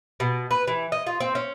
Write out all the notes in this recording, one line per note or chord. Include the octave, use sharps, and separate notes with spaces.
B2
B4
E3
D#5
F4
C4
C#4